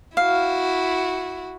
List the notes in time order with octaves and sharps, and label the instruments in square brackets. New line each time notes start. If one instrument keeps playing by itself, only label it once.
[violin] E4 F#4 [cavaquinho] F5